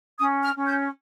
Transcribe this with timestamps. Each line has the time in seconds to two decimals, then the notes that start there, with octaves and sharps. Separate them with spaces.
0.18 C#4 D#6
0.43 F6
0.55 C#4
0.66 G6